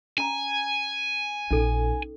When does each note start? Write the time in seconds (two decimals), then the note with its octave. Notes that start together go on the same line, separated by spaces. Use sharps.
0.18 C#4 G#5 A#5
1.51 A#1 C#4 D#4 A4